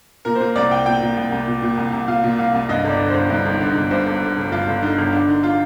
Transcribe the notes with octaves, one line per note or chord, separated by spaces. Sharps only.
A#2 A#4
C5
A#2 A#4
C2 D5
C2 G5
A#2 G5
A#2
C2
C2
A#2
A#2
C2
C2
A#2 F5
A#2
C2 F5
C2
G2 D#5
G1 D5
D3
G1 C5
G2 D#4
G1
D#4
D3
D#4
G1
G2 C5
G1
D3
G1
G2 F4
G1
D3 D#4
G1
D3 D4
D3 D#4
F4